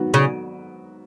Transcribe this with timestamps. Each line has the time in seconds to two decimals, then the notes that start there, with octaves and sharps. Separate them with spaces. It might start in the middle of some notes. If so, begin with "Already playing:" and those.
Already playing: G#2 D#3 F#3 B3 F#4
0.14 C#3